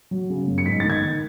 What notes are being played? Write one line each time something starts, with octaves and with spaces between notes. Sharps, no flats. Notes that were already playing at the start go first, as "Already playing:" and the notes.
F#3
C#3
F#2
C#7
G#2 B6
D#3 A6
G#6
D#3